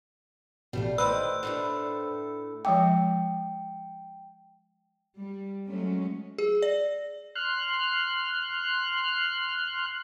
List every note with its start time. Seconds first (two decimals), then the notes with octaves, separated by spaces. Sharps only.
0.73 A1 B2 G3 A3 F5
0.98 A2 D#3 B4 C5 D#5 E6
1.43 A2 A3 D4
2.65 F3 G#3 G5 D6
5.18 G3
5.68 F#3 G#3 A3 C#4
6.38 G#4
6.62 D5
7.36 C6 F6 F#6